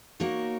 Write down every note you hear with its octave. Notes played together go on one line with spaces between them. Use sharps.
A#3 D#4 F#4 A#4 C#5